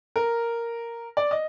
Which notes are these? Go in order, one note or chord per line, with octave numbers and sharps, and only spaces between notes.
A#4
D5
D#5